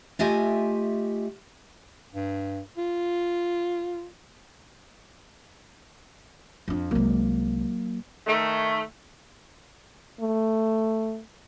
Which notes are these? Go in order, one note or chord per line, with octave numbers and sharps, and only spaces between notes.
A3 F4 G4 D#5 E5 G#5
G2
F4
F2 D4
C2 F#3 G#3 A#3
D#3 A3
A3